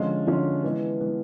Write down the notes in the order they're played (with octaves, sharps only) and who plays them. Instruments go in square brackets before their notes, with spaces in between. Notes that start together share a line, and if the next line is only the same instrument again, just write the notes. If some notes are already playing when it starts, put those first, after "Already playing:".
Already playing: [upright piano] D3 F3 G#3 C#4 F4
D3 F3 G#3 C#4 F4
E3 G#3 B3
E3 G#3 B3